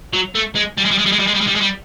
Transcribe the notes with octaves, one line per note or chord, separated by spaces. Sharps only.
F#3
A3
G#3
G3
G#3
G3
G#3
G3
G#3
G3
G#3
G3
G#3
G3
G#3
G3